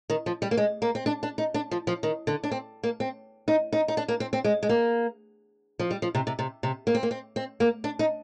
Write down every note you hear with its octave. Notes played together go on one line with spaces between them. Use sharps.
D#3
F3
G3
A#3
G#3
A#3
C4
D4
D4
D#4
D4
F3
F3
D#3
D3
D4
C4
A#3
C4
D#4
D#4
D#4
D4
A#3
C4
C4
G#3
G#3
A#3
F3
G3
F3
C3
C3
C3
C3
A#3
C4
A#3
C4
C4
A#3
D4
D#4